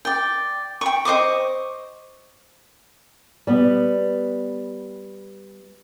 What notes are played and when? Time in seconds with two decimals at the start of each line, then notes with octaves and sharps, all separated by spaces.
0.05 D5 G5
0.81 G5 C#6
1.05 C5 D#5 C#6 D6
3.47 G3 B3